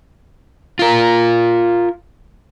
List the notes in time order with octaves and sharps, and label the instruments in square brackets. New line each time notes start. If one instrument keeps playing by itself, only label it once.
[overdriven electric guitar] F4 A#4